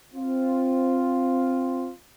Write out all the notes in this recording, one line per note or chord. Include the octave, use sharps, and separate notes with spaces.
C4 F4